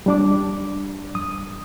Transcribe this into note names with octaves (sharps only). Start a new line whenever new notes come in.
G3 D4 D6
D#6